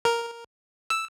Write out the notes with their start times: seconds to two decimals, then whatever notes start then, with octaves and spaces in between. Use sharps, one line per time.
0.05 A#4
0.90 E6